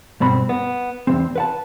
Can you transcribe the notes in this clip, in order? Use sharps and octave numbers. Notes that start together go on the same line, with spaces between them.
G2 B2 C4 B5
B3
E2 E3 C4
B4 F#5 A5